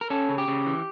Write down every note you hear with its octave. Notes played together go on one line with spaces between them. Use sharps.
A#4
C#4 A4
C#3
G4
C#3
E3